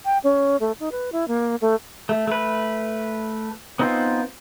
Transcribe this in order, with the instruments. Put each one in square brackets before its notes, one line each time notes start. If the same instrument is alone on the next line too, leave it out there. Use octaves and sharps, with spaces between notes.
[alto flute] G5
C#4
A3
D#4
B4
E4
A#3
A3
[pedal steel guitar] A3
A3 B4
B3 C4 D#4 F4